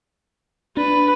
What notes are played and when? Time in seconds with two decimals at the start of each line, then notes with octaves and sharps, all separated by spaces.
0.77 D4 B4